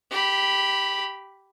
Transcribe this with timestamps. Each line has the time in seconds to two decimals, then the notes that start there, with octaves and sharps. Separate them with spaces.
0.11 G4 B5